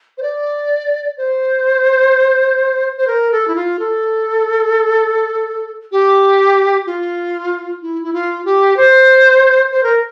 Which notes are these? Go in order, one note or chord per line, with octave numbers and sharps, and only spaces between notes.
C5
D5
C5
C5
A#4
A4
E4
F4
A4
G4
F4
E4
E4
F4
G4
C5
C5
A#4